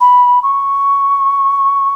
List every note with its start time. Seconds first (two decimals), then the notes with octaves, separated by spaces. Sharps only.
0.01 B5
0.43 C#6